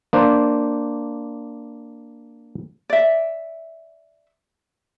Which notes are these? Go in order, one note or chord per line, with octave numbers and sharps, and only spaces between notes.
A#3 D4 C5
D5 E5